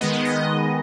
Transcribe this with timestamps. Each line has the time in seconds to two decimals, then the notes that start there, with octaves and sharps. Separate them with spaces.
0.01 D#3 G#3 B3 D#5
0.13 D#5
0.25 D#5